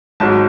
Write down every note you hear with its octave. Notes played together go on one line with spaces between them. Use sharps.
G#1 G#2 F#3 A5